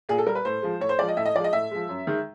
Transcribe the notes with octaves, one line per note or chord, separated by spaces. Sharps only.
A#2 G#4
A4
G3 A#4
B4
A2 C5
F3 G#3
A2 C#5
C5
F3 G#3 D5
D#5
A2 E5
D#5
F3 G#3 D5
D#5
A2 E5
F3 G#3
F#2
D#3 G#3